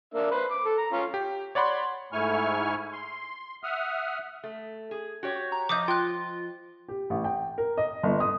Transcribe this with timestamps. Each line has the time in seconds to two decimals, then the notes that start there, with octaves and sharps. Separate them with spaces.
0.14 A#3 D4 E5
0.31 B4 C5
0.51 D6
0.65 A4
0.78 A#5
0.92 C#4 F4
1.14 G4
1.55 C#5 D5 F#5 B5 C6
2.13 G#2 A3 E4 G#5 C#6 F6
2.93 C6
3.63 E5 F#5 D#6 F6
4.44 A3
4.91 G#4
5.23 F#4 G4 C#5
5.52 A#5
5.69 F3 D#5 D6 D#6 G6
5.88 F4 G5 F#6
6.88 G4
7.10 A1
7.24 G5
7.58 A#4
7.78 D#5
8.03 G1
8.20 D#6